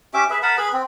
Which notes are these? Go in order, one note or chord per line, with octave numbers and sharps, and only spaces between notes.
C#4 G4 E5 D6
G#4 B4 E5
A#4 F#5 A5 B5
G#4 B4 B5
C4